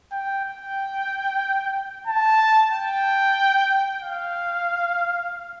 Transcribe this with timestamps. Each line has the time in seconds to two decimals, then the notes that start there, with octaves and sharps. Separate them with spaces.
0.12 G5
0.45 G5
2.07 A5
2.72 G5
4.02 F5